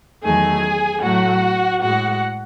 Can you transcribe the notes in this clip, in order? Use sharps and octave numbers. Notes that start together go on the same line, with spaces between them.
E2 D#3 F#3 A3 G#4 G#5
A2 F#3 A3 F#4 F#5
A2 G#3 F#4 F#5